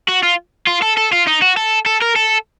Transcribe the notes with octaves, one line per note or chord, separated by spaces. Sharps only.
F#4
F4
F4
A4
A4
F4
D#4
F#4
A4
A4
A#4
A4